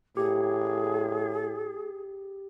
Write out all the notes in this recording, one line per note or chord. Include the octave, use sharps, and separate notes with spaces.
A2 G4 G#4